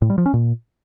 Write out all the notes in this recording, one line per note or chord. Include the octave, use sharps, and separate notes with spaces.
A2
G3
F3
C#4
A#2